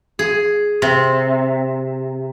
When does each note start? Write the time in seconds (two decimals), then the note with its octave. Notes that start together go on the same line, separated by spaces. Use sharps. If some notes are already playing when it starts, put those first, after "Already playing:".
0.19 G#4
0.82 C3